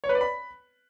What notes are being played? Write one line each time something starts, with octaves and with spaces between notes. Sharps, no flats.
C#5
B4
D5
B5